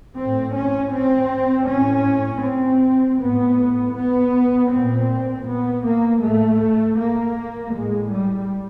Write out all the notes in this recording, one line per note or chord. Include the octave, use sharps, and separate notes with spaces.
A2 C4
C#4
C4
A2 C#4
C4
A2 B3
B3
A#2 C4
B3
A#3
A2 A3
A#3
A2 G#3
G3